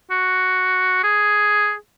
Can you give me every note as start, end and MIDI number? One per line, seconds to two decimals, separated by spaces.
0.11 1.00 66
1.04 1.74 68